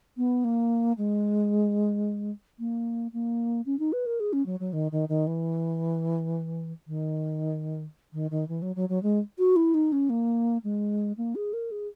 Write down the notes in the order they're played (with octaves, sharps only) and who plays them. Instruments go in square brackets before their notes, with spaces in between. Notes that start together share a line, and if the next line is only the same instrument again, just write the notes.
[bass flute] B3
A#3
G#3
A#3
A#3
C#4
D#4
B4
A#4
G#4
C#4
F#3
F#3
D#3
D#3
D#3
E3
D#3
D#3
D#3
E3
F#3
F#3
F#3
G#3
F#4
E4
D#4
C#4
A#3
G#3
A#3
G#4
A#4
G#4